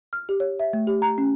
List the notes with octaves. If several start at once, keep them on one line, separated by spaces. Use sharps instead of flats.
F6
G4
C#5
E5
A3
G4
A#5
C#4